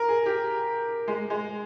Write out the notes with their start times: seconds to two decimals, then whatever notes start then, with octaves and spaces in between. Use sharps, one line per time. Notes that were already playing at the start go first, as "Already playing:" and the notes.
Already playing: A#4
0.08 G#4
0.26 G4
1.08 G#3
1.30 G#3